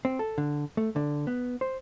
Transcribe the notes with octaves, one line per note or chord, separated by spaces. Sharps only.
C4
A4
D3
A3
D3
B3
C5